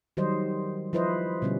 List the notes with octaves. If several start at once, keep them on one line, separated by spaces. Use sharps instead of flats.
D#3 F#3 G3 C5 D#5
F3 E4 B4 C5 D#5
B2 D3 G3 C#4